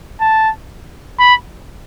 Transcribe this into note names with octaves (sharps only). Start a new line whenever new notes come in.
A5
B5